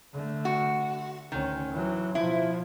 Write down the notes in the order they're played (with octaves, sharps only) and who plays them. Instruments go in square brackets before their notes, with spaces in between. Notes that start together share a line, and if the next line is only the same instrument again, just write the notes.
[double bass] D3 A3
[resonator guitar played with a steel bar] F#4
[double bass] D2 C#4 [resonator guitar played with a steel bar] D#3
[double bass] E3 F#3
[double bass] B2 F3 [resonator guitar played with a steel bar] E4